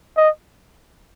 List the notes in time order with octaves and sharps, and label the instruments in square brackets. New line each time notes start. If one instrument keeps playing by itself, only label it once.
[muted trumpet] D#5